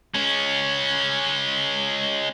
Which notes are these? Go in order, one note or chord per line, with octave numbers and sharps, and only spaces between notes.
G#3 C#4